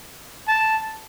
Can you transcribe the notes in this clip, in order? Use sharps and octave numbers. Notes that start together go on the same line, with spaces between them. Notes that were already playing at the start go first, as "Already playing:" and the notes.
A5